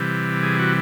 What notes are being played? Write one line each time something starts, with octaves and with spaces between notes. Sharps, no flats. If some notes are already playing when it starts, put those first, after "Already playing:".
Already playing: C3 E3 G3
G#4
F#4